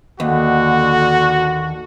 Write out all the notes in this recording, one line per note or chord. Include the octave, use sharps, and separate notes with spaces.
D#2 D3 F#4